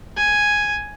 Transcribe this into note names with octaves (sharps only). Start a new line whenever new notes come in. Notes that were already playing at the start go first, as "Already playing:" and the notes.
G#5